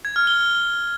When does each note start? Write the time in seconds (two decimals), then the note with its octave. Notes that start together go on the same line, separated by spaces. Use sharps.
0.05 G#6
0.16 F6
0.27 G7